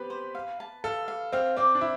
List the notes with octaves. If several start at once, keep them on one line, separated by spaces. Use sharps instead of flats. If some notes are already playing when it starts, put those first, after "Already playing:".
Already playing: B3 C4 G4 B4
C5
F5
A5
A4 F5
F5
C4 F5
C4 D5
D4
E4